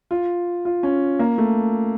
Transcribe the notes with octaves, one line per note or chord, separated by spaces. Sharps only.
F4
F4
C#4
A#3
A3